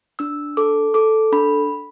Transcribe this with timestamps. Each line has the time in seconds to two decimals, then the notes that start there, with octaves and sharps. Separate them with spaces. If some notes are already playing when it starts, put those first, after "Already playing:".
0.19 D4 E6
0.57 A4 D6
0.94 A4 D6
1.32 D4 B5